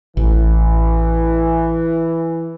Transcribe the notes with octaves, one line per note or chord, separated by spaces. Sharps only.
A1 E3